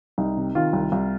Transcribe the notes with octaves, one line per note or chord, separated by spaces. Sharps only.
C2 D#4
C3
D#3 F4
C2
C2